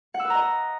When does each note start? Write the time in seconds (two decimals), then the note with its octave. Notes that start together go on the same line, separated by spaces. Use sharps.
0.14 F#5
0.20 E6
0.25 B4
0.30 A#5
0.35 D#5